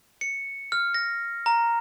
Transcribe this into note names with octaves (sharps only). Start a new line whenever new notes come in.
C#7
F6
A#6
A#5